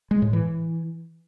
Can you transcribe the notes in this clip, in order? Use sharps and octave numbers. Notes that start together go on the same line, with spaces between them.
G#3
A2
E3